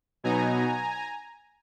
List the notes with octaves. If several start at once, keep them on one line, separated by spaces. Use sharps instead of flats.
B2 F#3 B3 D#4 G#5 A#5